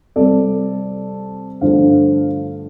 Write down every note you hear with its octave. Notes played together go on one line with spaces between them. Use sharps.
C3 G3 C4 A4 D5
G2 D3 F3 A3 C5 F5